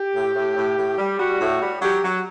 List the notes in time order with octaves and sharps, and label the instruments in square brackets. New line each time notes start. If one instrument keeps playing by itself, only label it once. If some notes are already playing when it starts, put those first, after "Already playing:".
Already playing: [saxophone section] G4
A2
A2
A2
A2
G3
G3 F#4
A2
G3
F#3 G4
F#3 F#4